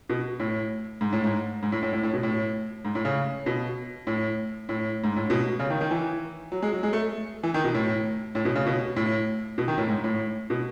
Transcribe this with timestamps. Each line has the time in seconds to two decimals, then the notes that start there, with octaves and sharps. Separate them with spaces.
0.09 B2
0.40 A2
1.01 G#2
1.13 A2
1.24 G#2
1.63 G#2
1.72 A2
1.83 A2
1.93 A2
2.03 A2
2.13 B2
2.23 A2
2.85 G#2
2.95 A2
3.05 C#3
3.46 B2
4.07 A2
4.69 A2
5.04 G#2
5.16 A2
5.30 B2
5.60 C#3
5.70 D#3
5.81 D#3
5.91 E3
6.52 F#3
6.62 G#3
6.72 F#3
6.83 G#3
6.93 A3
7.43 E3
7.54 D#3
7.64 B2
7.75 A2
8.35 A2
8.45 B2
8.56 C#3
8.66 B2
8.96 A2
9.58 B2
9.68 D#3
9.78 A2
9.89 G#2
10.04 A2
10.50 B2